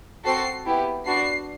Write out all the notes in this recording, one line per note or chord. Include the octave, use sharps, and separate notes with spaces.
C4 F#4 A4 C7
B3 E4 G4
B3 D4 F#4 C7